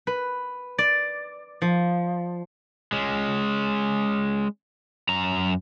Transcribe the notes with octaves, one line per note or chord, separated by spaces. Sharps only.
B4
D5
F3
G#3 C#4
F#2 A#5